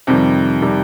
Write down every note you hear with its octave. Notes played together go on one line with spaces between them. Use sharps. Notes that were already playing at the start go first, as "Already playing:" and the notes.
F2 C3 D#3 G3
C3 D#3 G3